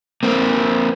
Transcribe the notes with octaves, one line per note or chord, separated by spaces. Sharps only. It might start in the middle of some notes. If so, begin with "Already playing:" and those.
A#3 C4